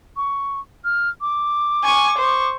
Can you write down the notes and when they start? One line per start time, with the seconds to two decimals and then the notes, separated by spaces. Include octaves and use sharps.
0.17 C#6
0.85 F6
1.21 D6
1.83 G#5 C#6
2.18 C5 C#6